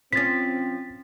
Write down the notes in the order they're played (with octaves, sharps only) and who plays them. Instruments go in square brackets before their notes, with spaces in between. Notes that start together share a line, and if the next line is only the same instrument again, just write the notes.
[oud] F3 C#4 [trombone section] C4 [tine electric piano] A6 B6